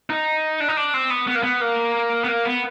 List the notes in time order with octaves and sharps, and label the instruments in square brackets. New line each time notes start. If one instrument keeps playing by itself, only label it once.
[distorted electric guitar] D#4
D4
D#4
D4
C4
B3
B3
A#3
B3
A#3
B3
A#3
B3